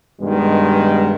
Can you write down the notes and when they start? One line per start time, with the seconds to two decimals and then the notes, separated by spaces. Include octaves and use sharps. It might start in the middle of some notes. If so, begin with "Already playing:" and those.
0.20 G2 B2 D#3 G#3